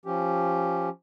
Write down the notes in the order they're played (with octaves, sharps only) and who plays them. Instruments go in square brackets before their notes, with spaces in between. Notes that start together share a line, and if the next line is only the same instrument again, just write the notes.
[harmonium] F3 C#4 G4